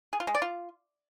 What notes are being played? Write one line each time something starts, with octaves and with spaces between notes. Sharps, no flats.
G#4
F4
G#3
D5
F4